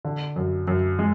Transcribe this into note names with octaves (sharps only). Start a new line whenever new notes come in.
D3
F#2
F#2
G#3